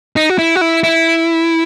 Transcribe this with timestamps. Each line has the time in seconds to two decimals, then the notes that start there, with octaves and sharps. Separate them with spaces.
0.16 D#4
0.30 F#4
0.38 E4
0.56 F#4
0.61 E4
0.84 E4